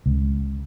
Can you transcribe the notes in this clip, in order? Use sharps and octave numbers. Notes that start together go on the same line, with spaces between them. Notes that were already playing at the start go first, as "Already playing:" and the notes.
C#2